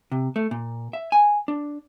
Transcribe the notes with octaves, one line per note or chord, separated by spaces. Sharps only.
C3
A3
A#2
E5
G#5
D4